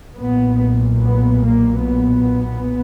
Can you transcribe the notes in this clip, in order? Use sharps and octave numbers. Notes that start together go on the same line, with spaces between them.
B1 A#2 B3
B3
A#3
B3